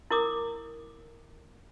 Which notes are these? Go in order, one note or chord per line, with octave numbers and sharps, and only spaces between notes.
E4 A#4 D6 D#6